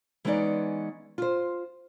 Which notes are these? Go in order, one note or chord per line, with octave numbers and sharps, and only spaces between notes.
E3 G#3 B3 C#4 D#4 D5
F4 C5